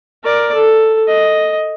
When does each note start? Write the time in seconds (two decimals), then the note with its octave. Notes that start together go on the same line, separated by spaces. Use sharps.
0.24 A#4 D5
0.54 A4
1.08 D#5